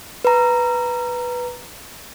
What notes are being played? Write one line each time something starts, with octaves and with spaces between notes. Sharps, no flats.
B4 A#5